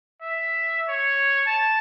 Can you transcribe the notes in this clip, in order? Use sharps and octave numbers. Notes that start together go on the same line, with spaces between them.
E5
C#5
A5